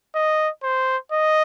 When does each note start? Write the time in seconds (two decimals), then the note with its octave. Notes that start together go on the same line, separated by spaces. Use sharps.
0.15 D#5
0.63 C5
1.12 D#5